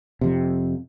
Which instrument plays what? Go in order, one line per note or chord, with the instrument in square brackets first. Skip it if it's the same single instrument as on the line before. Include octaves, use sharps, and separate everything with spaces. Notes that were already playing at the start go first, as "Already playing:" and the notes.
[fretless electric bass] F2 C3